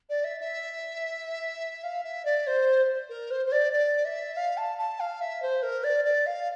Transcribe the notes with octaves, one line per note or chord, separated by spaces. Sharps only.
D5
E5
E5
F5
E5
D5
C5
A#4
C5
C5
D5
D5
E5
F5
A5
A5
F5
E5
C5
A#4
D5
D5
F5